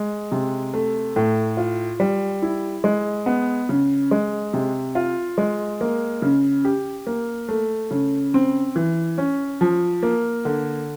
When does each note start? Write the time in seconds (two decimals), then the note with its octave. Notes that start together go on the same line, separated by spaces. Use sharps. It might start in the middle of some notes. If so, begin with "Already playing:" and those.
Already playing: G#3
0.32 C3
0.74 A3
1.16 A2
1.57 F4
2.00 G3
2.42 E4
2.84 G#3
3.26 B3
3.69 C#3
4.11 G#3
4.54 C3
4.95 F4
5.38 G#3
5.81 A#3
6.22 C#3
6.65 G4
7.07 A#3
7.49 A3
7.91 C#3
8.34 C4
8.76 E3
9.18 C#4
9.61 F3
10.03 A#3
10.45 D3